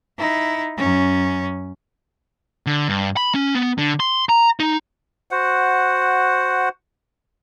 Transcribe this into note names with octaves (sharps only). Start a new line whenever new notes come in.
D#4 E4
F#2 C#4
D3
G2
B5
C#4
B3
D3
C6
A#5
D#4
F#4 C5 F#5